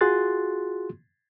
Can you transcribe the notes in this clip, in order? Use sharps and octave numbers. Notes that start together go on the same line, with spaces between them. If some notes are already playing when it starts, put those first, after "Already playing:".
F4 F#4 G#4 C6 F#6 A6